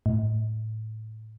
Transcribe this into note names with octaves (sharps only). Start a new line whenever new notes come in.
A2